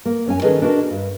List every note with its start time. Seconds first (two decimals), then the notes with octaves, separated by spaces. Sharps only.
0.06 A#3
0.26 F#2 C#4 G#5
0.42 D#3 C#4 G#4 A4 B4 D#5
0.62 D4 E4 F#4 A#4 D#5
0.90 G2